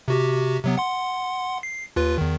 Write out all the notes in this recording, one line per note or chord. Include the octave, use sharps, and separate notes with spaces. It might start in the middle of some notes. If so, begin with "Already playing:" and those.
C3 F#4 G4
C3 F#3 B3
F#5 C6
C7
D#2 F4 B4
E2 D#3